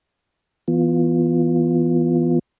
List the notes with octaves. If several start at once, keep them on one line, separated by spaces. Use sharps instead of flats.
E3 B3 F4